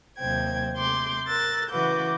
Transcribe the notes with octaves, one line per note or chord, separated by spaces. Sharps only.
D#2 C3 F#3 C5 G5 G#6
C3 C6 D6 G6
A#4 E6 F#6 A6
C#3 E3 F#4 B4 D6 G6